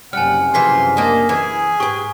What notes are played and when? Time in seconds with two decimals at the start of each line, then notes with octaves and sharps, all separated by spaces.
0.13 F#1 C3 G3 F#5 G#5 F6
0.54 C#3 E3 F3 G#5 C6 B6
0.97 A#3 D4 D#5
1.29 E3 G#4
1.80 G#2 G4 B4 C#6